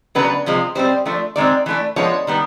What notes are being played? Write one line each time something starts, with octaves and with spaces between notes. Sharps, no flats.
C#3 F#3 B3 D4 B4
C3 F3 G#3
B2 G3 C4 C5
F3 A3 D4
D#3 G#3 C4 D5
E3 A3 D4
F3 G#3 B3 D4 C#5
D#3 G3 B3